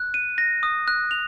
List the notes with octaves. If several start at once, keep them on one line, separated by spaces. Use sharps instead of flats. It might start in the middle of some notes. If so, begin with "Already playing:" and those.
Already playing: F#6
D#7
A#6
D#6
F#6
F7